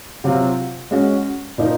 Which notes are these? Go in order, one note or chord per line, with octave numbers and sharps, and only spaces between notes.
C3 F#3 C4 F4
G#3 C#4 F#4
A#2 F3 A#3 D#4